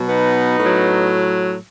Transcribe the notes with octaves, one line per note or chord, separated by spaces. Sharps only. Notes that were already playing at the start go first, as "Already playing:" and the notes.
Already playing: B2 F#3
B3 D#4
A2 F#3